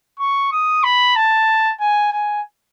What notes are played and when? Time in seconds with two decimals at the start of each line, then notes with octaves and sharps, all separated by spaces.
0.19 C#6
0.52 D#6
0.84 B5
1.16 A5
1.80 G#5
2.12 G#5